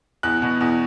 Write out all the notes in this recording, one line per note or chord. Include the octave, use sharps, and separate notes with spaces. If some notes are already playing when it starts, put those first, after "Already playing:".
E2 F#6
B2
E2